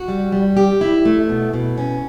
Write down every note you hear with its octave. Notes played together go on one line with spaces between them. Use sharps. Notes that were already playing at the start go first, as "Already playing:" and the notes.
Already playing: F#4
G3
G3
G4
E4
A3
B2
B2
C#4